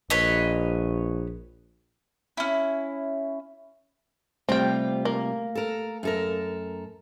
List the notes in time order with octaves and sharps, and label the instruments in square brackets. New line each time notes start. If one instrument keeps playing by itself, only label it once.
[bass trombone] A#1 [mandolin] B4 C#5 D#5
[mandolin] C#4 E4
[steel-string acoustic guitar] C3 G3 F4 [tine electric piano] A3 [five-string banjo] C4 G5
[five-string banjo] A#3
[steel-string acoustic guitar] A4 A#4
F#2 A4 A#4